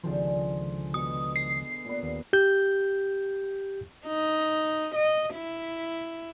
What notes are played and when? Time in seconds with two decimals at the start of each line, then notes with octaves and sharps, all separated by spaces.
0.04 C#2 D3 D#3 F3 G#4 C5
0.94 B2 D#6
1.36 C7
1.85 A#2 B3
2.03 D#2
2.33 G4 G6
4.07 D#4
4.95 D#5
5.35 E4